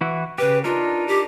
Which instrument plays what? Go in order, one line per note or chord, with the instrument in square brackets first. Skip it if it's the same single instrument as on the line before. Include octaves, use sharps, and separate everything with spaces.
[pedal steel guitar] E3 E4 F#4
[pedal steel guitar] C#3 G4 [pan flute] B4
[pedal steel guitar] D4 D#4 A#4 [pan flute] F4
[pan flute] G4